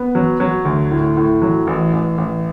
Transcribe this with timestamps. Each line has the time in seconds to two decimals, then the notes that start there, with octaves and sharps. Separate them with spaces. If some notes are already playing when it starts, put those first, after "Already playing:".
Already playing: B3
0.15 F#3
0.40 F#3
0.65 D2
0.91 A2
1.17 A2
1.42 F#3
1.67 A1
1.93 A1
2.18 A1